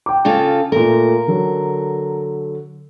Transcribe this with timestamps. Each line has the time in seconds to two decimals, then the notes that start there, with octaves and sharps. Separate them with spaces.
0.06 G5 D6
0.25 C#3 F4 A4
0.72 A#2 A3 A#4
1.27 D3 F#3 A4